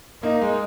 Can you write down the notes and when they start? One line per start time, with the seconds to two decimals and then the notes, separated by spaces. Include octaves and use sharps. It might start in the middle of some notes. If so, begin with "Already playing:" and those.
0.23 A#3 D#4
0.41 G#3